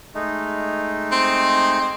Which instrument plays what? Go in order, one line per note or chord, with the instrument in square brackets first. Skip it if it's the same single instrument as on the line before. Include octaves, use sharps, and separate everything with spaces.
[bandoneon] G#3 A3 D#4
[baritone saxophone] C4